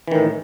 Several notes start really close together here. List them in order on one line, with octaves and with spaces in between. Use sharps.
E3 D#3 A2